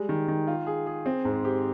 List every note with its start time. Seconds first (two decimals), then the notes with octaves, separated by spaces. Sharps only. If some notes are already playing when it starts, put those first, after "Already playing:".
Already playing: G3 G#3
0.09 D#3
0.28 D#3
0.47 F4
0.67 G#4
0.87 G#4
1.06 C4
1.25 G#2
1.45 G4